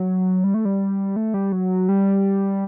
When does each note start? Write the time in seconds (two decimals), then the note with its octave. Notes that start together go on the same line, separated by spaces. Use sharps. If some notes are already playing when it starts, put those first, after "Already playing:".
Already playing: F#3
0.44 G3
0.54 A3
0.65 G3
1.16 A3
1.34 G3
1.52 F#3
1.89 G3